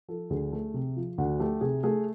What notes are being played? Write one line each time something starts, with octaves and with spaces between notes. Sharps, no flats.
F3 A4
D2 G#4
A3
C3
F3
D2 F#4
A3 G4
C3 G#4
A3 G#4